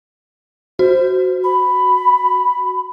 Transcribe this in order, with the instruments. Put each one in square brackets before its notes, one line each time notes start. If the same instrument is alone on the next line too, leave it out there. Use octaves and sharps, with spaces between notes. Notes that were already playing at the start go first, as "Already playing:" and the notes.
[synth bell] F#4 [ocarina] C5
[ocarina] B5